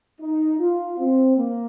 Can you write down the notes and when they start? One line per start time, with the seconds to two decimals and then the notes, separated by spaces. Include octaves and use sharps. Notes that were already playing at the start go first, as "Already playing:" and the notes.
0.21 D#4
0.59 F4
0.98 C4
1.37 A#3